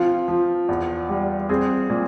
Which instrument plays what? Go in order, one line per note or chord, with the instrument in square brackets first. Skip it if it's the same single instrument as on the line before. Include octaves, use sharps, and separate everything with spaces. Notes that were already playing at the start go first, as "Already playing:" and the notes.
Already playing: [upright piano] F3 C4 F4
F3
E2
G3
C4 G#4
A#2